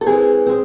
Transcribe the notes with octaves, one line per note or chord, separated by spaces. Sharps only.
A4
E3 G#3 C4 G#4
G#3 C4